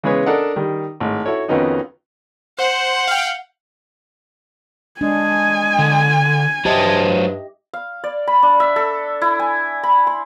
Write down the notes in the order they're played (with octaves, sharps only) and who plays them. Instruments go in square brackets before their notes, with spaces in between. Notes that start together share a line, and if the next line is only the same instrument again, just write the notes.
[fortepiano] C#3 E3 G#3 B3 B4 C#5
D4 A4 A#4 D#5 F#5
D#3 G3
G#1 A2
E4 F#4 A4 C#5
F2 D#3 B3 C#4 D#4 F#4
[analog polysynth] C5 [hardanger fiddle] F#5
[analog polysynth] F5 G5
[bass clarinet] G#3 [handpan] D4 [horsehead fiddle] G#5
[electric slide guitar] D3
[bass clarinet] G2 [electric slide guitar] F#3 C5 A5 [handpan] G4 D#5 E5
[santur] F5
D5
B5
D4
E5
A4
E4
G#5
B5
C6